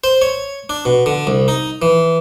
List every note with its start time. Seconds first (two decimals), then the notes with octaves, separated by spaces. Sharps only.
0.04 C5
0.22 C#5
0.70 D4
0.85 B2
1.06 D3
1.27 C2
1.48 D#4
1.82 E3